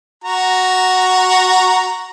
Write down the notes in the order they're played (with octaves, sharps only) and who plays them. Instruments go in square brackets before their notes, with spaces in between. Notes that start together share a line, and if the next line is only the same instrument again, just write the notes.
[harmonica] F#4 A#5